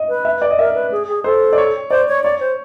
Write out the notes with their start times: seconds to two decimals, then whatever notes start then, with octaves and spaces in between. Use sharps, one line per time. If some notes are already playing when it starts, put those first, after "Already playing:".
Already playing: D#5
0.09 B4
0.25 E5
0.42 D5
0.50 D#5
0.58 A#4 E5
0.75 B4
0.92 G#4
1.08 G#4
1.24 A4 C5
1.53 D5
1.58 C#5
1.90 C5 D5
2.08 C#5
2.24 C#5 D5
2.40 C5